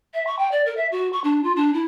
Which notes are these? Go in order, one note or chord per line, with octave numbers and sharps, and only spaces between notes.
E5
C#6
G5
D5
A#4
E5
F#4
C#6
D4
F4
D4
E4